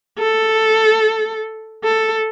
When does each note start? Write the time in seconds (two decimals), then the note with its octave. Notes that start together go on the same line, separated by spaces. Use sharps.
0.19 A4
1.84 A4